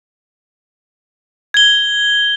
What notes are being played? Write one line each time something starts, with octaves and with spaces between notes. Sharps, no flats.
G#6 G7